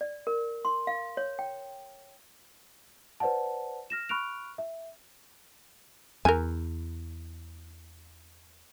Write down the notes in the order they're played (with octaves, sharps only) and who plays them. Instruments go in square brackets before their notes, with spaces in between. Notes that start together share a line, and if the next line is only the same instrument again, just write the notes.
[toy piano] D5
A#4
C6
F5
C#5
G5
[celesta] B4 C5 D5 F#5 A5
F6 A#6 E7
B5 C#6 F6 F#6 D7 F7
E5
[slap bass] E2 [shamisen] A#4 G#5